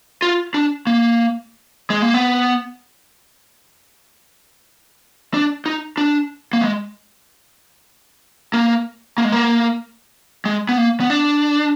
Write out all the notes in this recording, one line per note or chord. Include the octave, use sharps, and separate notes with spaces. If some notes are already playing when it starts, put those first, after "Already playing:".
F4
D4
A#3
G#3
A#3
B3
D4
D#4
D4
A#3
G#3
A#3
A#3
G#3
A#3
G#3
B3
A#3
B3
D4